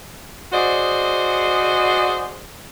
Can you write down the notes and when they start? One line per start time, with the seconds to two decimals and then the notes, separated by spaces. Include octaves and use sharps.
0.53 F#4 G#4 C5 D5 D#5